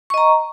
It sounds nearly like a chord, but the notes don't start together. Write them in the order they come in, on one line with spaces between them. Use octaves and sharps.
C#6 D#5 A#5